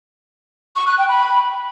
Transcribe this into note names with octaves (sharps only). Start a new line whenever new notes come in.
C#6
F#6
G5
B5